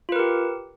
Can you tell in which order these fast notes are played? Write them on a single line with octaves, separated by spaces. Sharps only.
F4 B4 A#4 G4